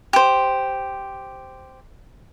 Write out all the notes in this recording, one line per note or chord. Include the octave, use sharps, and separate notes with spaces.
G4 C5